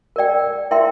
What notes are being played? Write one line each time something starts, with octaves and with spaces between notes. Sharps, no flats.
A#4 D5 G5
E4 A#4 E5 G5 C6